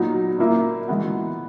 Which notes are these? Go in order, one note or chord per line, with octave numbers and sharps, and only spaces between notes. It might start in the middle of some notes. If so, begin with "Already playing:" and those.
Already playing: A#2 F#3 B3 D#4 F#4
A#2 A#3 E4
E3 G#3 B3 F#4